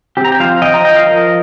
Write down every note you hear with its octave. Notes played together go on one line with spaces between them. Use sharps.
C4 G4
A#5
G5
F3 C5 F5
F3 D#5 G5
A#5
F3 D#5 G5
F5
F3 A#4 D#5